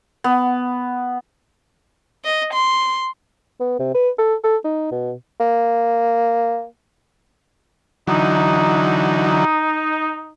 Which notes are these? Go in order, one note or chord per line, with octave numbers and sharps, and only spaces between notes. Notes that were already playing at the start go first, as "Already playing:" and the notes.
B3
D#5
C6
B3
C3
B4
A4
A4
D#4
B2
A#3
D3 E3 F#3 D#4